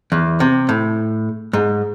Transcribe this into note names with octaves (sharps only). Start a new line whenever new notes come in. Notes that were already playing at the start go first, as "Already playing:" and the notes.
E2
C3
A2
G#2